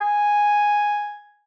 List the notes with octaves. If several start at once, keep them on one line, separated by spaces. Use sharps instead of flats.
G#5